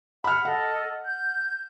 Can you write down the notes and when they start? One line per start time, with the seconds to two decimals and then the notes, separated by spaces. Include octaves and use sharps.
0.24 F#5 B5 F6
0.45 A4 D#5 F#5
1.04 G6